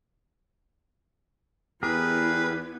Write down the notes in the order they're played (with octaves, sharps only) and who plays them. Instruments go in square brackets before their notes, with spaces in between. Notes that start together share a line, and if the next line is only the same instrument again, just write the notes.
[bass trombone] E2 [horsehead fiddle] B3 E4 [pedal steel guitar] G4 G#4 A#4 [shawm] B4